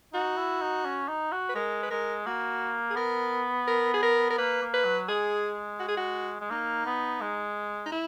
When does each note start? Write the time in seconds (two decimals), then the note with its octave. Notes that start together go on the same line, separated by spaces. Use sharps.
0.14 D#4 F#4
0.37 E4
0.61 D#4
0.85 C#4
1.08 D#4
1.32 F#4
1.49 B4
1.55 G#3 A#4
1.83 B4
1.91 G#3 A#4
2.26 A#3 F#4
2.90 G#4
2.96 B3 A#4
3.68 A#4
3.94 G#4
4.03 A#4
4.30 A#4
4.38 A#3 B4
4.62 A#3
4.73 B4
4.85 F#3
5.09 G#3 G#4
5.79 F#4
5.88 G#4
5.97 F#4
6.40 G#3
6.50 A#3 D#4
6.86 B3
7.21 G#3
7.86 D#4
7.92 E4